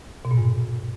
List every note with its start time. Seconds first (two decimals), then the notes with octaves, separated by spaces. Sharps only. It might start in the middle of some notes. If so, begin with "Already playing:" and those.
0.25 B2
0.31 A#2
0.37 G2